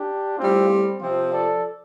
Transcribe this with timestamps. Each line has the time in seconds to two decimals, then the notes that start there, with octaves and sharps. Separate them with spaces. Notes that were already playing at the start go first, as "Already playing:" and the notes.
Already playing: D4 G4
0.37 A2 G3 C4 F4
0.68 C4
1.00 C3 F3 C4 F4
1.31 A4 D5